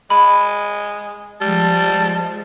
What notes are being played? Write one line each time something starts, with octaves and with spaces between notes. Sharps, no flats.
G#3 B5
F3 G3 G#3 A5